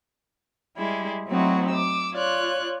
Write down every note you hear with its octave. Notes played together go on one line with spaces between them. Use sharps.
G3 G#3 E4
F#3 A3 C4 D#4 E4 F#4
D6 E6
F4 C#5 D5 F#6